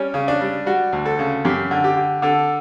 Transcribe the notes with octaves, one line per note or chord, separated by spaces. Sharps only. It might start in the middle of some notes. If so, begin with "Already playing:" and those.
Already playing: G3 C#4
C#3
D4
G3
G3 F#4
D2
A4
C#3
F#2 G4
D3
G4
D3
D3 A4